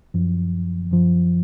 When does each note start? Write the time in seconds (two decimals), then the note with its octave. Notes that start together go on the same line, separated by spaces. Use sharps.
0.14 F#2 F3
0.91 F#2 F3